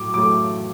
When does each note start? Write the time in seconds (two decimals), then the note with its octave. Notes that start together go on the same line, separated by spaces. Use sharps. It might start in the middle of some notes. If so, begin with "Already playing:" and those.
Already playing: A2 F#3 A3 D6
0.14 A2 F#3 A3 D6